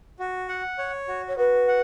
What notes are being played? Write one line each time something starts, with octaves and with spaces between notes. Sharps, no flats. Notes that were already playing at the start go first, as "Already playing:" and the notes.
F#4
F#5
C#5
F#4
C#5
F#4 B4
F#5